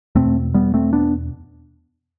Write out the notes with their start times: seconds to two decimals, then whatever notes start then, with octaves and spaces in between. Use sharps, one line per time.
0.15 E2 B2 A3 C4
0.54 G3 B3
0.74 A3 C4
0.93 B3 D4